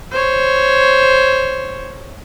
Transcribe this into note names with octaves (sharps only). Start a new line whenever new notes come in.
C5 C#5